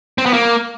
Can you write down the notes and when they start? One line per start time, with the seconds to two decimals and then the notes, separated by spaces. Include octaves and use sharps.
0.18 C4
0.26 B3
0.33 A#3